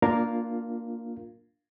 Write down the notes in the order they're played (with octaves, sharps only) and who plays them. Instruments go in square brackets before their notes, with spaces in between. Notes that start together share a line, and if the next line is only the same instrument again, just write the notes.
[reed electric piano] A#3 D4 F4 A#4 F5